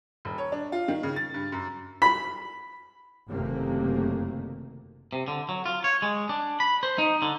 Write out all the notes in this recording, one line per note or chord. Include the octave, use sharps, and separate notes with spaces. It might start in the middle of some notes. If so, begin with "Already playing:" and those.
D#1
C#5
D4
F4
D#3
C#3
A6
G2
F#2
B5
F#1 F#2 C3 D#3 A3 A#3
C3
D3
F#3
F4
C#5
G#3
D4
B5
C5
D#4
D3